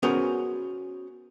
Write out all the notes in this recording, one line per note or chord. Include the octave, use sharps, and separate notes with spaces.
B3 C#4 F#4 G#4 A#4 C5